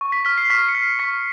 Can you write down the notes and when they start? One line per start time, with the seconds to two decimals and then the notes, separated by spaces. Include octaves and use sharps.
0.01 C#6
0.12 B6
0.25 F6 B6
0.37 C7
0.50 C#6 B6
0.68 C#7
0.75 F6 C7
0.99 C#6 B6 C#7